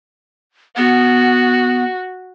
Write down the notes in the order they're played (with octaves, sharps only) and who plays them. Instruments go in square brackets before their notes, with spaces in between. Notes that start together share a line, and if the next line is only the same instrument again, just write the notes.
[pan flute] B3 [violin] F#4